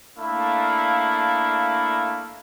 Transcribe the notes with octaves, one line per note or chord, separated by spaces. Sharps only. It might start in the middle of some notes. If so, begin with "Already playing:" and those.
A3 A#3 D4 E4 F5